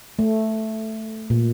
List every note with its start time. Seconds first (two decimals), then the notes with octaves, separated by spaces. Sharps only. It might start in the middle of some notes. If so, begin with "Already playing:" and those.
0.19 A3
1.30 A#2